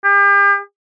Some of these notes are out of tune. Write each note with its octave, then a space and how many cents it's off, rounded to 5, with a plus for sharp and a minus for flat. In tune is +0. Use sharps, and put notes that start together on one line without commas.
G4 +40